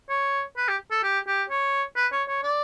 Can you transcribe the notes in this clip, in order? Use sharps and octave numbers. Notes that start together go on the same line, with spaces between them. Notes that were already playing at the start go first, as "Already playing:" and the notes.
C#5
B4
G4
A4
G4
G4
C#5
B4
C#5
C#5
D5